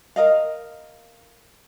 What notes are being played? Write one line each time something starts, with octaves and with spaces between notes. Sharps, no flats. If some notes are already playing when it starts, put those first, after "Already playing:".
A#4 D#5 F5